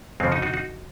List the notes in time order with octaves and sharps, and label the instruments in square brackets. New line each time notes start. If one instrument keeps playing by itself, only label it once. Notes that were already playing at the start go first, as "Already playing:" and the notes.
[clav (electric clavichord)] F2 C#3 F3 G#3 C4
D#4 F#4
D#4 F#4
D#4 F#4